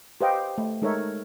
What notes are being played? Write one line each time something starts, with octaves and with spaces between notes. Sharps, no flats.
G4 B4 C5 D#5 F5 G5
A3
G#3 D#4 A4 A#4 C#5 E5